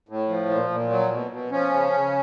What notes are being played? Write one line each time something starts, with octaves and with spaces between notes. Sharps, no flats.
A2
F3
A#2
A#2
F#3
B2
B2
F3 C#4
C#3
C#3